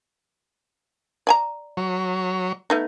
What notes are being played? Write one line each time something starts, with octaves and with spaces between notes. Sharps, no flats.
D5 G#5 A#5
F#3 C#5
A3 B3 D#4